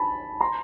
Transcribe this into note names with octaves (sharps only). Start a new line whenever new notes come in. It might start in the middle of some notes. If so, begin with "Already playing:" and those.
Already playing: G#5 A5 B5
A#5 C6